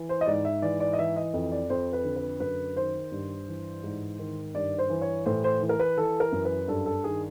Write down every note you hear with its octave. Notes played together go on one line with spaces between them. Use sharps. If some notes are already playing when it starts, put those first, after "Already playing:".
Already playing: E3
C5
D#5
G#2 D5
E5
E3 D5
D5
D#5
E3 E5
D#5
F2 D#5
D5
F2 C5
B4
D3
B4
F#2 B4
D#3 C5
G2
E3
G#2
D#3
G2 D5
C5
E3
C#5
A2 C5
C5
E3
A#4
B4
E3 A4
A#4
F#2
B4
G2 A4
A4
D#3 G#4